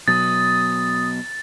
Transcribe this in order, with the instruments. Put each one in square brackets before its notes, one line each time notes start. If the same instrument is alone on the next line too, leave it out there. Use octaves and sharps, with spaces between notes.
[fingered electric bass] B2 F#3 [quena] D#6 [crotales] A6